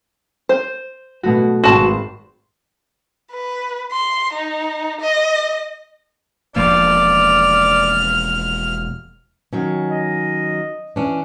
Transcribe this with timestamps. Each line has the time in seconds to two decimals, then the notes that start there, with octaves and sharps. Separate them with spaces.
0.49 C5
1.23 B2 A3 F#4
1.64 G#1 F#4 A5 C6
3.32 B4
3.92 C6
4.33 D#4
5.01 D#5
6.56 E1 F3 A#3 D5 F6
9.53 D#3 F#3 C#4
9.91 D#5
10.96 E3 C#4 D4